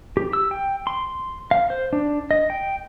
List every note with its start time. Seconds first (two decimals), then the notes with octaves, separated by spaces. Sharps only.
0.17 G4
0.33 E6
0.51 G5
0.87 C6
1.51 F5
1.70 C5
1.93 D4
2.31 D#5
2.50 G5